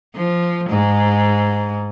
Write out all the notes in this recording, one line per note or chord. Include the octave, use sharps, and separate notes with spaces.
F3
G#2